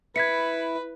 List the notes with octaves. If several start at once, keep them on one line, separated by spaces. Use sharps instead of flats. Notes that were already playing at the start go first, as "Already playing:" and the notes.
E4 B4 G#6 B6 C#7